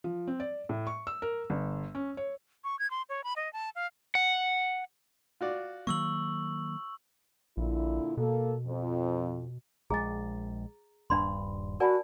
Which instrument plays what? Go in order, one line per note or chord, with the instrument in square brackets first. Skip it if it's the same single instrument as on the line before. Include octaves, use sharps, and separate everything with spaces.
[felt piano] F3
C4
D5
A2
C#6
E6
A#4
G1
C#4
C#5
[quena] C#6
G#6
C6
C#5
B5
D#5
A5
F5
[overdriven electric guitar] F#5
[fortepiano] F4 F#4 D5
[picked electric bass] D#3 F#3 A#3 [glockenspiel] C#6 E6 F#7
[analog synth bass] A#1 [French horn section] A#2 D3 E4
[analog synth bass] B2 [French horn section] A#3 A4
[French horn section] F2
[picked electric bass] A#1 G#3 [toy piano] G#4 [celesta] A#5 A6
[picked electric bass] D#1 G2 [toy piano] D4 B5 C6
[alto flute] F#4 [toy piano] A#4 D5 G#5 [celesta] F#5 A5 B5